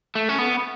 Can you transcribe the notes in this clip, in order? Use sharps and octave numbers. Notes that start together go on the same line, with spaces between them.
A3
C#4
B3